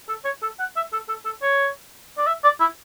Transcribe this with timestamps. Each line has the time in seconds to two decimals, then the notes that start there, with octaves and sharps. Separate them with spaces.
0.08 A4
0.25 C#5
0.42 A4
0.59 F#5
0.76 E5
0.92 A4
1.09 A4
1.25 A4
1.42 C#5
2.18 D5
2.27 E5
2.44 D5
2.60 E4